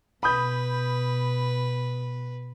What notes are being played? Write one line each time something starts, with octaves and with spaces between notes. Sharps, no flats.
B2 B4 B5 D#6 G6